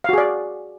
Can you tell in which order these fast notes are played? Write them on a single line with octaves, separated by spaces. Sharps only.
F5 F#4 G#4 D5